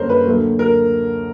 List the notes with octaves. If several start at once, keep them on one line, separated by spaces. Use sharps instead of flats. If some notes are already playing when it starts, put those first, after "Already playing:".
Already playing: F#2 D3 G3 A#3 D4 A#4 C5 C#5
B4
D2 D3 F#3 A#3
A#4